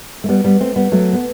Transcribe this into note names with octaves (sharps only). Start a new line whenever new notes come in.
A3
G3 B3
G3 B3
A3 C4
G3 B3
F#3 A3
B3